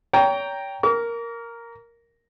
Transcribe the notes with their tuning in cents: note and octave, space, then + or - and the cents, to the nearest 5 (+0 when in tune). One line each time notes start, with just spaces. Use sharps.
C#5 +35 G5 +0 A#5 +0
A#4 +0 D6 -45